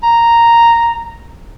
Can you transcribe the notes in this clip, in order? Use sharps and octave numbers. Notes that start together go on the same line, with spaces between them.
A#5